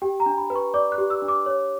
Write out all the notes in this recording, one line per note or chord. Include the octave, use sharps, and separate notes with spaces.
G4 G5
A#5
D4
B5
B4
C#6
D5 D6
F#6
G4
E6
D4
D6
C#5